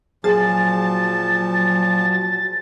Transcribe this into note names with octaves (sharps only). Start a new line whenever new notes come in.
A#2 F3 F#3 G#4 A5 A6